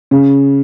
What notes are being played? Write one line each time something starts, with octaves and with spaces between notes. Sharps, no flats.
C#3